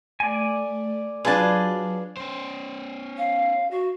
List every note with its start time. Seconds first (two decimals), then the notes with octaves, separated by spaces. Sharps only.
0.20 A3 D5 G#5
1.25 F#3 D4 F4 G#4 B4 A5
2.17 C#4 C5
3.18 F5
3.71 F#4